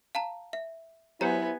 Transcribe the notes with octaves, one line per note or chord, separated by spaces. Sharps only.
F5 A5 A#5
E5
F#3 B3 E4 G4 C5 F#5 G#5 A#5